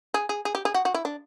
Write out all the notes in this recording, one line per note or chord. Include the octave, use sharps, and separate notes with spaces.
G#4
G#4
G#4
G4
G#4
F#4
F#4
E4
D4